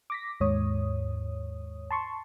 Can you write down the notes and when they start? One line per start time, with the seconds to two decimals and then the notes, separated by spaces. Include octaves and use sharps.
0.10 D6 A#6 B6
0.40 D#2 G#2 C#5 D#6
1.91 A5 C6 C#6